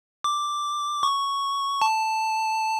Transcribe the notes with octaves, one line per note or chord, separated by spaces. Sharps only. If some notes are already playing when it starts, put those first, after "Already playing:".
D6
C#6
A5